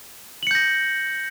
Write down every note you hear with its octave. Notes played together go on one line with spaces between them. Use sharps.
G6 A#6 C#7 F#7